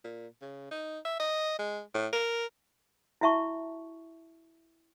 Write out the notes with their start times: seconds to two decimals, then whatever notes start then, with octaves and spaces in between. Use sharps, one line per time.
0.04 A#2
0.42 C#3
0.71 D#4
1.05 E5
1.20 D#5
1.59 G#3
1.94 A2
2.13 A#4
3.21 E4 F#4 E5 A5 C#6